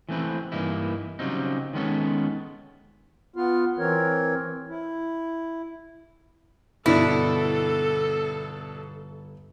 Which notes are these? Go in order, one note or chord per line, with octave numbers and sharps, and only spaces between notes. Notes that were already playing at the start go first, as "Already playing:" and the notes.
E3 A3 C4 B4
G2 E3 A#3 D#4 E4
C#3 F#3 G3 C4 D#4
D#3 G#3 B3 C#4 A4
B3 F4
E3 C4 A#4 C#5
E4
G1 B2 D4 E4 A4